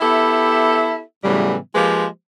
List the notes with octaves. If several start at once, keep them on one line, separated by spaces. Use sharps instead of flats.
B3 E4 G4 A4 E5
A2 C#3 E3 F#3 G3 B3
F3 G#3 A#3 G4 B4 C5